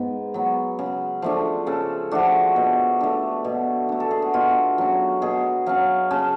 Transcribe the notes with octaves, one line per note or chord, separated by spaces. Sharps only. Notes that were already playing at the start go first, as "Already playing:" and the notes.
Already playing: G#2 B3
F#3 B3
C#3
F3 A3 D4
C#3 A4
F3 A3 D4 F#4
B2
A3 D4
B2
A3 D4
A4
G#4
F#4
B2 F4
F#3 C#4 F#4
B2 G#4
F#3 C#4 F5
C#3 A5